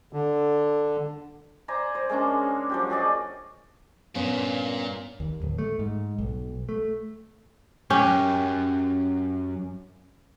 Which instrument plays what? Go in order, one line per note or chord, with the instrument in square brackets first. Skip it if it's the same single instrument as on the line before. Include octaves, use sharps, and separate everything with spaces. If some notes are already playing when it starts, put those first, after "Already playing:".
[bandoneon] D3
[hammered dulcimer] C5 D5 G#5 A#5
C5
G#3 A#3 C#4 D4
F3 F#3 G4
F#4 G#4 D5 D#5
[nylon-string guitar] G2 B3 C#4 [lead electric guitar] A#2 A#3
[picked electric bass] D#2
D1
A3
G#2
B1
A3
[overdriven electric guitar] F#2 [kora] C#4 G4